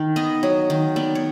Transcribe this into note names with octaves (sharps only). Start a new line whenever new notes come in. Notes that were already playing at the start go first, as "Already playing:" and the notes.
Already playing: D#3
B3 D#5
F#3
D#3
B3 D5
C#5